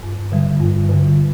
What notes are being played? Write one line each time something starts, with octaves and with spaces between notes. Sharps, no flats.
G2
D3 G3
G2
D3 G3